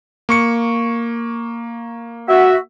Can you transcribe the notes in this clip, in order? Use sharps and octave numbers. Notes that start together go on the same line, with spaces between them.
A#3 C#6 C#7
F#4 E5